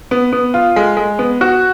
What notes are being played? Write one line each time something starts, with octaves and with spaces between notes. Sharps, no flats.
B3
B3
F4
G#3
G#3
B3
F#4